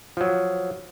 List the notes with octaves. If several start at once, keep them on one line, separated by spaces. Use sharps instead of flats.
F3 F#3